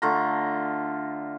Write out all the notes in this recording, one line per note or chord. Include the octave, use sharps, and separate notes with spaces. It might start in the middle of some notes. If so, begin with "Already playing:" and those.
D3 A3 F4 A#5